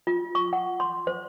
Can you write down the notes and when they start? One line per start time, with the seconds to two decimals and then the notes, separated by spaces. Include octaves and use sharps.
0.07 F4
0.35 C#6
0.53 F#5
0.80 C6
1.07 C5